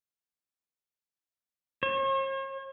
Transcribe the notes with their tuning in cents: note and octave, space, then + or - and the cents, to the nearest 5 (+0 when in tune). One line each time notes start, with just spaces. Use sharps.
C#5 -45